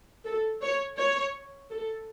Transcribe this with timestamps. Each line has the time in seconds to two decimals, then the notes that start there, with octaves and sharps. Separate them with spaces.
0.25 A4
0.62 C#5
0.97 C#5
1.70 A4